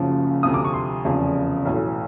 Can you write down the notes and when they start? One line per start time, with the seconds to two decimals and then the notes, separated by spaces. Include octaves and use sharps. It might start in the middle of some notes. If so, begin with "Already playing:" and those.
Already playing: F#1 F#2 C#3 F3
0.43 D2 C3 F3 D#6
0.54 D6
0.65 C#6
0.74 C6
1.04 F1 E2 C#3 F3
1.65 B1 A2 E3